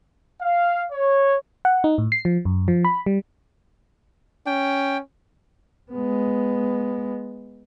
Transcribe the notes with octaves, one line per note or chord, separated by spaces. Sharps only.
F5
C#5
F#5
D#4
A2
C7
F3
F#2
F3
B5
G3
C#4 G5
G#3 B3